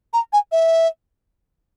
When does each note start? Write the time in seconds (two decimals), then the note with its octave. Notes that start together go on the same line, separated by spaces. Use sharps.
0.13 A#5
0.33 G#5
0.52 E5